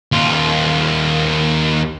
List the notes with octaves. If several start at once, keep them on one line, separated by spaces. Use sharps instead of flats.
D#2 F4